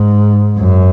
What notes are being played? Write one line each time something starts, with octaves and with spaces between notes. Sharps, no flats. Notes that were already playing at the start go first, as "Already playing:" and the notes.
Already playing: G#2
F#2